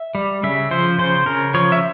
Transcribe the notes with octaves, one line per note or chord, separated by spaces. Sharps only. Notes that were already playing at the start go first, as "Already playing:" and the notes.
Already playing: E5
G3
C#3 E5
F3 C5
C#3 C5
C#3 A#4
F3 C#5
E5